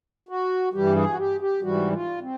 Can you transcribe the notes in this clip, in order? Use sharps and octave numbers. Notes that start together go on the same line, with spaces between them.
F#4
G2 E3 G3 G4
G#4
F#4
G4
G4
G#2 E3 G3 F#4
F4
C4